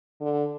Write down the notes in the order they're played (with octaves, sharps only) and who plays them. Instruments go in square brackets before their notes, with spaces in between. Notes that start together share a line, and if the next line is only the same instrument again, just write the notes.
[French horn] D3